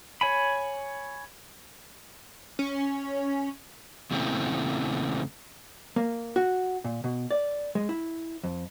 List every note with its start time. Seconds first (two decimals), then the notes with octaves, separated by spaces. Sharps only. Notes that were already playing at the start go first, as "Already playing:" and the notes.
0.21 C#5 G#5 B5
2.59 C#4
4.11 E2 A#2 C#3 A3 C4 E4
5.96 A#3
6.36 F#4
6.84 A#2
7.04 B2
7.31 D5
7.75 G#3
7.89 E4
8.44 F2